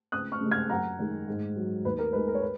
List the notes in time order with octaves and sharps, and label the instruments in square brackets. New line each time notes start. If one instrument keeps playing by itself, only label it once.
[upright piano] C#2 D#6 F#6
C#6 F6
C#3 G#3
F6 G#6
F#2 F#5 A#5
D#3 G#3
G#2
F#3
D#2 B4
A#4
D#3 G#3 B4
A#4
C#5
B4